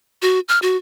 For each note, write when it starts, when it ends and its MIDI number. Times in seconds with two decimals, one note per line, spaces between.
0.22 0.40 66
0.49 0.59 89
0.62 0.77 66